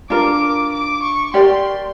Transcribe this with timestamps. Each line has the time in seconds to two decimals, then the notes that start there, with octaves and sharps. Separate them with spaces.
0.10 D4 F4 A#4 D6
0.72 D6
1.03 C#6
1.34 G4 A#4 D5 G5 C6